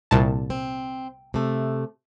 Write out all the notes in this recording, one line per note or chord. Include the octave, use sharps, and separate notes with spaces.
C2 A#2 A5
C4
C3 A3